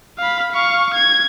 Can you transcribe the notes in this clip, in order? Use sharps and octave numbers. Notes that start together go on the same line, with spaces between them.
F5 B5
F5 C#6
G#6